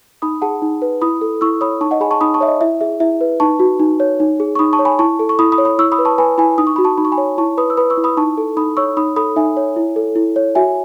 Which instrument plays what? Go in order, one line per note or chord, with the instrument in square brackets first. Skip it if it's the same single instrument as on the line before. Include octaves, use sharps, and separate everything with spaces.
[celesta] D#4 B5 D#6
G#4 F#5 A5
D#4
B4
E4 B5 D#6
A4
E4 C#6 E6
C#5 B5 D#6
D#4 A5 C#6
D#5 F#5
G#4 G#5 B5
A5 C#6
D#4 B5 D#6
A5 C#6
C#5 E5
D#5
E4 E5
G#4 E5
E4 E5
B4
D#4 A5 C#6
F#4
D#4
C#5
D#4
G#4
C#6
D#4 B5 D#6
A5 C#6
C#5
G#5 B5
E4 A5 C#6
A4
C#6
E4 B5 D#6
B5 D#6
C#5
B5 D#6
E4 C#6 E6
B5 D#6
B4
A5 C#6
B4 G#5 B5
E4 G#5 B5
D#4 D#6
C#6
F#4 B5
A5 C#6
D#4 B5
C#6
G#5 B5
C#5
E4 A5 C#6
B4 B5 D#6
E6
B4 B5 D#6
C#6 E6
E4
B5 D#6
D#4 A5 C#6
A4
D#4 B5 D#6
C#5 C#6 E6
D#4 B5 D#6
A4 B5 D#6
D#4 E5 G#5
C#5
E4
A4
E4
C#5
F#4 E5 G#5